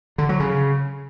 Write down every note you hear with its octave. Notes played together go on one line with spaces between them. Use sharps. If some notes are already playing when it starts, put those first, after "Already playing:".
D3
F#3
C#3